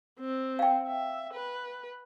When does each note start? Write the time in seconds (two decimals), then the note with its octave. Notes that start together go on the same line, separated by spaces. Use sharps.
0.20 C4
0.59 F5 G5
0.87 E5
1.34 B4